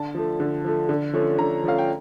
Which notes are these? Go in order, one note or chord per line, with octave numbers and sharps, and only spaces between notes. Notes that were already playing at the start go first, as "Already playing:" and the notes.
Already playing: D3 A5
F3 A3
D3
F3 A3
D3
F3 A3 C#4
D3 A#5
F3 A3 C#4 F5
G5